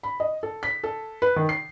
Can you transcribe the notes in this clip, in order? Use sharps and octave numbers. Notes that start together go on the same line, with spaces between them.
B5
D#5
A4
B6
A4
B4
D#3
C7